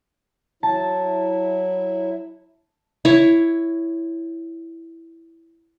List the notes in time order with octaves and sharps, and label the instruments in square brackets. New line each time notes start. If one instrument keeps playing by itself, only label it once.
[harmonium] F#3 E4 [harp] A5
[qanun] E4 C#5